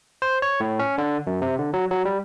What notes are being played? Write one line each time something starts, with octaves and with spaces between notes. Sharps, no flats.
C5
C#5
A2
C#4
D3
F#2
C3
D3
F#3
F#3
G3